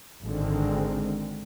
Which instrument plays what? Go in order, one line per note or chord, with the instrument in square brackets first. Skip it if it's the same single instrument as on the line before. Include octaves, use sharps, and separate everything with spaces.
[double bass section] G#1 G#2 D3 D#3 G#3 C4